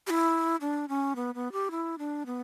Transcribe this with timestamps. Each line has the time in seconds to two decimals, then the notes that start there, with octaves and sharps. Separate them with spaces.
0.07 G4
0.10 E4
0.61 D4
0.89 C#4
1.16 B3
1.35 B3
1.52 G4
1.71 E4
1.98 D4
2.26 B3